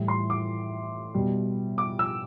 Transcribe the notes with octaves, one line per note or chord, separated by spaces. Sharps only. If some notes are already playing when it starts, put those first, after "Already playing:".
Already playing: A2 E3 G3
C6
D6
B2 G3
D6
E6